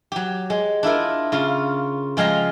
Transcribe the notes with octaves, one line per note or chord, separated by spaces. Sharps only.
F#3 G4
G#3
D4 E4 F4 A#4
C#3 F4
F3 G#3 F5 G5 A#5